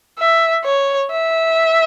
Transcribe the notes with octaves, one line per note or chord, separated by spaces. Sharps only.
E5
C#5
E5